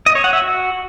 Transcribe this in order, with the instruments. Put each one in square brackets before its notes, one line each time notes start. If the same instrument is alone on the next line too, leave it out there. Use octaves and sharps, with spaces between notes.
[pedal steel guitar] D#5
C#5
F#5
E5
F#4